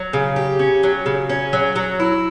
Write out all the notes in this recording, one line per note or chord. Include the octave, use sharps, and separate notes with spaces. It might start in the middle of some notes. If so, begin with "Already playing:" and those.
Already playing: F#3
C#3
G4
C#4
F#3
C#3
C#4
F#3
F#3
E4